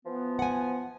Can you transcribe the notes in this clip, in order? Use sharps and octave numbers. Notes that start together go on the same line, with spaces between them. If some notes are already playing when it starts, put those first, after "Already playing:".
E3 F3 B3
F#5 G#5